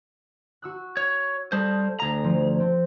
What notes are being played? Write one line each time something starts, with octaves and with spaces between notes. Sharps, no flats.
F#4 E6 F#6
C#5
G3 A4 C5
D2 A#5
F3
C4